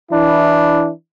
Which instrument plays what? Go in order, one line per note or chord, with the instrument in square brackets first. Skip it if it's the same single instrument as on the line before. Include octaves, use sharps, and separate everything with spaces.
[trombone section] E3 D4 E4